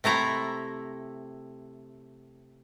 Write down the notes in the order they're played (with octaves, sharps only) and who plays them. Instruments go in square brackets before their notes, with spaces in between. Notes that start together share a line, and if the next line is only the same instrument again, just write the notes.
[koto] C3 A3 E4 A#5